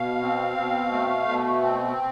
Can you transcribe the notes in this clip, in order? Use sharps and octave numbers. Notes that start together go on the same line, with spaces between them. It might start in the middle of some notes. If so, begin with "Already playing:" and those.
Already playing: B2 F5
C4
B2
A3
B2
C4